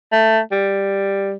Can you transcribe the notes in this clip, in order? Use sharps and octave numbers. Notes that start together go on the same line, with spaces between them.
A3
G3